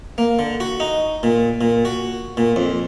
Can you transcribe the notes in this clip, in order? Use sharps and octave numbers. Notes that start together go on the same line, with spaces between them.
A#3
D3
F#4
D#4
A#2
A#2
F#4
A#2
F2